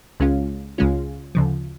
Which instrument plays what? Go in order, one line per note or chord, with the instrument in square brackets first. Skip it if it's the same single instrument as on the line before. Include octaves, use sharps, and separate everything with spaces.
[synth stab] C#2 C#3 G#3 C#4 F4
C#2 C#3 G#3 C#4 F4
D2 C#3 F3